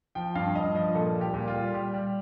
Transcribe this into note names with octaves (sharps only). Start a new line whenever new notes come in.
F3 G5
G2 F5
G2 D#5
F3 D#5
A#2 A4
G3
G4
A#2
F4
G3
G3 G4
G3